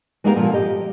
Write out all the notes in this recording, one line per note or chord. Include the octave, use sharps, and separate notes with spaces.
G#3 A#3 B3 E4 G4 A#4
A#2 D3 F3
G4 D#5